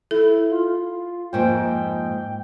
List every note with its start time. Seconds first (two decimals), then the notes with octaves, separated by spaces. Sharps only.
0.11 E4 A4
0.51 F4
1.33 F2 G#2 A#3 G5